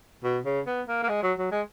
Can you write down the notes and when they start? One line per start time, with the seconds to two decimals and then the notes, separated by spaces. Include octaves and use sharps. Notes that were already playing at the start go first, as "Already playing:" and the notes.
0.24 B2
0.45 C#3
0.67 B3
0.88 A#3
1.03 A#3
1.09 G#3
1.23 F#3
1.38 F#3
1.52 G#3